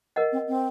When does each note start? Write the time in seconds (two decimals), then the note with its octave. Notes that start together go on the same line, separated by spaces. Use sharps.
0.16 A#4 D#5 F#5
0.32 C4
0.48 C4